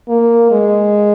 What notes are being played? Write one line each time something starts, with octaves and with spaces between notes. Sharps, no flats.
A#3
G#3